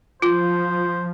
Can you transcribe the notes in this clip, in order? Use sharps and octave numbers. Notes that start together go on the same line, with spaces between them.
F3 F4 C5